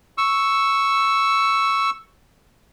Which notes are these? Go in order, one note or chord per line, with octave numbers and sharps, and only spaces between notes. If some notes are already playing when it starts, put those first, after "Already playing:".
C#6 E6